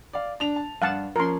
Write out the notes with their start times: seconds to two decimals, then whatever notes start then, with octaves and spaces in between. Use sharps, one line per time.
0.13 D5 F5
0.40 D4 F7
0.56 A5
0.82 G2 D4 F5 F#5 A5
1.16 F3 A#3 C#4 A#4 C6